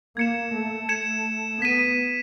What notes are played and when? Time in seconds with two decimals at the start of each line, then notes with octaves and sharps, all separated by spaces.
0.17 A#3 G#6 C#7 E7
0.53 A3
0.88 A3 G#6 C#7 E7
1.60 B3 G#6 B6 D#7